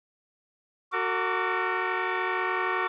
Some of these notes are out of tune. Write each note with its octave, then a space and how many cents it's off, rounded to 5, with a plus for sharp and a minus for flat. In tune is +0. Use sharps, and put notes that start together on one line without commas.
F#4 +0 A#4 -45 D6 -20